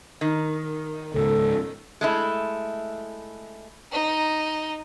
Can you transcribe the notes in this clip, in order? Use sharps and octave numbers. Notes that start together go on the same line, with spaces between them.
D#3
C#2 G#2 C#3 A4
G#3 A3 E4
D#4